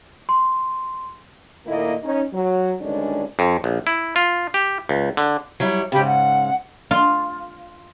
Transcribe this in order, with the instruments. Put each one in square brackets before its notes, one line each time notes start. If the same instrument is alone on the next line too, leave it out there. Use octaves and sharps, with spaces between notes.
[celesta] C6
[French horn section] A#2 D#3 A3 A#3 E4 D#5
C#4 D#4
F#3
D2 G2 D#3 G#3 C#4 D4
[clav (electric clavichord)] F2
A#1
E4
F4
G4
C#2
D3
[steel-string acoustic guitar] F#3 G3 E4
[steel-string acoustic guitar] G#2 C#3 [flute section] G4 G5 B5
[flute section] F#5
[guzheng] F4